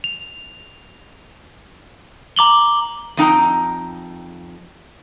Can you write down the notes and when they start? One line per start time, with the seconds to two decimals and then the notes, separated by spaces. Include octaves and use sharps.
0.04 F7
2.36 A#5 D6 F#7 G7
3.17 F2 D#4 G5 A#5